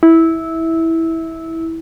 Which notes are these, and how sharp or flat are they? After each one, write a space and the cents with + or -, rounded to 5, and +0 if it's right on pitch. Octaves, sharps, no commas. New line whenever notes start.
E4 -15